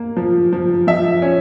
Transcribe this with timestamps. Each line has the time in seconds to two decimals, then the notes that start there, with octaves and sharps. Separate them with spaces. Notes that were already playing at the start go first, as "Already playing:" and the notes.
Already playing: A#3
0.17 F3
0.53 F3
0.87 F3 E5
1.22 C#4